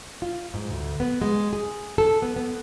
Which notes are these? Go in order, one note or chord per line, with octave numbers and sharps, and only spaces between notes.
F4
G#2
D2
B3
G#3
G#4
A4
B3
B3